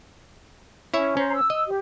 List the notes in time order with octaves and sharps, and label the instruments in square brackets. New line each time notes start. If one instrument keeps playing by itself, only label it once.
[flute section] C#4 [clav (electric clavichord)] E4 C#5 E5
[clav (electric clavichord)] C#4 [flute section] C5 A#5
[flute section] E6
[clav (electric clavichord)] D#5
[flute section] G4